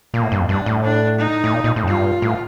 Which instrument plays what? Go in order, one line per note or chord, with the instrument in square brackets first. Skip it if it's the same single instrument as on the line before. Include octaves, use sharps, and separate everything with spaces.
[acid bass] A#2 [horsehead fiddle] A#3
[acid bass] A2
G2
F2
[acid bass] G2 [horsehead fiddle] D4
[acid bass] A2
[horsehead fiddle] D4
D#4
[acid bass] A2
A#2
A#2
A2
F2
[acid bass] G2 [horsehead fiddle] F4
[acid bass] A2